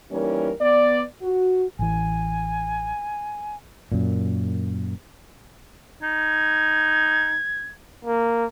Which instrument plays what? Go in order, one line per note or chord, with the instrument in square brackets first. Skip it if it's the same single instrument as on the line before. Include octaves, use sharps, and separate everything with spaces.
[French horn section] E3 G3 A#3 C#4 D#4 A#4
B3 D5
F#4
[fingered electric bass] A1 E3 [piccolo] G#5
[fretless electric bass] F#2 A#2
[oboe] D#4 [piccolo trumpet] G#6
[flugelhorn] A#3